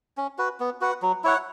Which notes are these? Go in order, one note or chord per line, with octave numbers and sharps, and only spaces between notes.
C#4
F#4 B4
B3
F#4 B4 F#5
F#3
E4 C#5 F#5